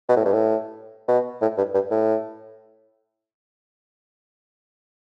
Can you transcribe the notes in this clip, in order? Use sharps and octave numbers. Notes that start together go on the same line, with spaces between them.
B2
A2
G2
A2
B2
A2
G2
G2
A2